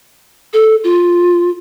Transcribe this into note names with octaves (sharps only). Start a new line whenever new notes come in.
A4
F4